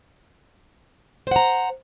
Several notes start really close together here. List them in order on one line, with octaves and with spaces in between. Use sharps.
C5 F#5 A#5